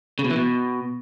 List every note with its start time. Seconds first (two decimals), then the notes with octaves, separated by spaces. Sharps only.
0.19 C#3
0.25 B2
0.30 E3
0.36 B2